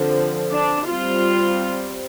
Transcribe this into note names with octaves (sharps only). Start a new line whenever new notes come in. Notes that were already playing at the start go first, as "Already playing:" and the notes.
Already playing: D3 F3 C4
D4
G3 C4 F4